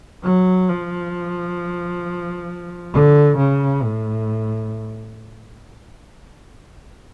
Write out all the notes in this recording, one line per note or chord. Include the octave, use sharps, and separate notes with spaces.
F#3
F3
D3
C#3
A2